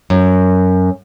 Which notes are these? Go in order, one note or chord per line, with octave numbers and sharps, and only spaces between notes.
F#2